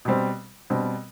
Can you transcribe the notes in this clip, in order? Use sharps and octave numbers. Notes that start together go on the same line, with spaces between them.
B2 G3 C4
B2 G3 C4